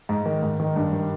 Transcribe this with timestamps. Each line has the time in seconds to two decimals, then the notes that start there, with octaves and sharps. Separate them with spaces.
0.09 G#2
0.26 D#3
0.43 G#2
0.60 D#3
0.76 G2
0.93 D#3